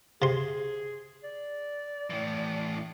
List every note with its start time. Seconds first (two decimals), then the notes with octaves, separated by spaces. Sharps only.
0.22 C3 G#4 C6
1.24 D5
2.10 A2 E3